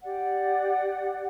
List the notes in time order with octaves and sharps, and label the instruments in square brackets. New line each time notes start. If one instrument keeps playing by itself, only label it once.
[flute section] G4 D5 F#5